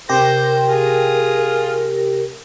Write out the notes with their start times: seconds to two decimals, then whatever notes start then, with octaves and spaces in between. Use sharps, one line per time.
0.09 C3 G4 A#4 C5 A#6
0.66 F4 G#4